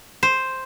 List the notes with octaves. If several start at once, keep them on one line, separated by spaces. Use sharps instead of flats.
C5